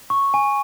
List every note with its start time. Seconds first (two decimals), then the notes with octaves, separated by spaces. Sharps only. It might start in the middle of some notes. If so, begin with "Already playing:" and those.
0.10 C#6
0.34 G#5